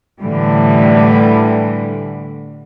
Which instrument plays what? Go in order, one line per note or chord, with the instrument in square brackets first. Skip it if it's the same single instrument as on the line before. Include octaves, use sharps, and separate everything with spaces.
[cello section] A2 D3 E3 G3